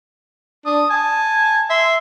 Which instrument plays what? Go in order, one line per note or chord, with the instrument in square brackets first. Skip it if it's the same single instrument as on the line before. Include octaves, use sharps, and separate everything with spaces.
[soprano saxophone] D4 [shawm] D#6
[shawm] G#5 [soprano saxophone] A5
[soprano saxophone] E5 [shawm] C6